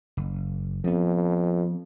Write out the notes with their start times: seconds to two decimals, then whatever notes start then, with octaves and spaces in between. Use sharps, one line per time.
0.17 F#1
0.84 F2 F3 B3